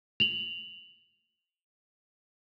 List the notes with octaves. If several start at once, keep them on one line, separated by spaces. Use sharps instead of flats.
F7 F#7